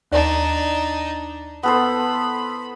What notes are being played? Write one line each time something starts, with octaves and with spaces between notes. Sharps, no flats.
D#2 D4 D#4 D5
B3 A4 C5 B5